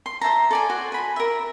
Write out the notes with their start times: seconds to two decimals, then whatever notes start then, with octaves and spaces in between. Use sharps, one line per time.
0.06 C6
0.21 C5 E5 A5 A#5
0.51 A4 D5 G#5
0.70 F#4 C5
0.92 G#5 B5
1.16 A#4 E5